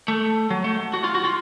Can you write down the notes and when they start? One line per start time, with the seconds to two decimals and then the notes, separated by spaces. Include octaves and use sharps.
0.08 A3
0.50 F#3
0.64 A3
0.94 F#4
1.04 F4
1.15 F#4
1.25 F4